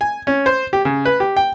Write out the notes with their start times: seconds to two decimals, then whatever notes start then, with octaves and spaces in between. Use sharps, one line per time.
0.01 G#5
0.27 C#4
0.46 C5
0.73 G4
0.85 C#3
1.05 B4
1.20 G4
1.37 G5